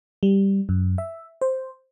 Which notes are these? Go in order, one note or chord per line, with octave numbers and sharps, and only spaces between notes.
G3
F#2
E5
C5